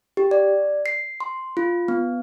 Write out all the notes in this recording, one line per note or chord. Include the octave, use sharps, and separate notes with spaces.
G4
D5
C7
C6
F4
B3